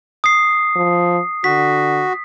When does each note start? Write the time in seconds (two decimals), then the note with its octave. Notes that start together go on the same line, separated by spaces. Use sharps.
0.24 D#6 C7
0.76 F3
1.44 D3 F#4 B6